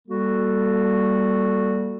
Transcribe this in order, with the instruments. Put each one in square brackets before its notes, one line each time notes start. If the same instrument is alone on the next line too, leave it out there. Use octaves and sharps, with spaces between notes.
[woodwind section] G3 A#3 F#4 A4